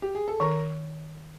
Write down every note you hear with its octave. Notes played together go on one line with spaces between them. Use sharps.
G4
G#4
A4
D#3 A#4